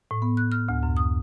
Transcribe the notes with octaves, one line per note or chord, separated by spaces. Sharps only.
A2
B3
F#6
F6
D2
F#2
D#6